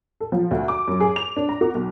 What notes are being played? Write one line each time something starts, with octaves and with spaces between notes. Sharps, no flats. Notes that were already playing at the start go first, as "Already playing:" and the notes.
A4
F3
D2
D6
F#2
G#4
F7
D4
A#5
F#4
B1